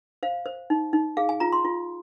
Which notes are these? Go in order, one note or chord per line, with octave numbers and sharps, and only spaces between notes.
C5 F5
C5
D#4
D#4
G#4 F5
G#5
F4 A#5
C6
F4